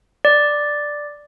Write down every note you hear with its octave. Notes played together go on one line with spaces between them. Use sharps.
D5